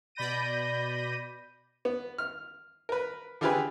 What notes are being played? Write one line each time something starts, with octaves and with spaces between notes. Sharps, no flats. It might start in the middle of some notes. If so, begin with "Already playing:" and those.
B2 D5 B5 G6 A#6 D#7
B3
F6
A#4 B4
D3 E4 F4 G4 G#4 B4